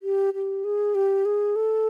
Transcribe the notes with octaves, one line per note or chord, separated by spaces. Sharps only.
G4
G4
G#4
G4
G#4
A4